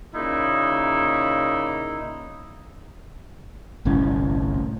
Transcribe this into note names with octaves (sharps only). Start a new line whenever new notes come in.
A#2 C#3 D#4 E4
G1 C2 A2 C#4